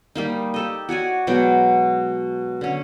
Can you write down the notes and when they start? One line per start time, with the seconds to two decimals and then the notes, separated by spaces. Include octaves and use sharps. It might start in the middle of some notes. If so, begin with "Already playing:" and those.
0.15 G3 A#3 D#4
0.54 G4 A4 D#5
0.89 F#4 C#5 D5 G#5
1.27 B2 F#3 G#3 G5
2.61 D3 C#4